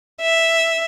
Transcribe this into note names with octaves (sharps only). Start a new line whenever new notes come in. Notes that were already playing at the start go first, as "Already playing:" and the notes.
E5